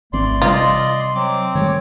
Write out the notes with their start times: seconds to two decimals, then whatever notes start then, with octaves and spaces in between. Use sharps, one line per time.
0.13 G#1 E3 A3 C4 D5 C6
0.42 C3 G3 F4 D#5
1.15 F#3 C4 D6
1.55 D#3 G3 G#3 C#5